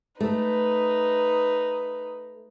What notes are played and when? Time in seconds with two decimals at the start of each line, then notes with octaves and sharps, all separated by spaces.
0.21 A3 D#4 B4